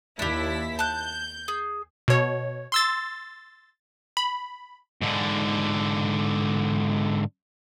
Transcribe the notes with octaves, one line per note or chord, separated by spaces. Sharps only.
D#2 D4 E4 G4 B6
A5 F#6 G6
G#4
B2 C#5
C6 E6 A6
B5
G#2 D3